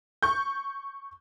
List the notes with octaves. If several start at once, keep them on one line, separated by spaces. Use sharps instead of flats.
C#6 G6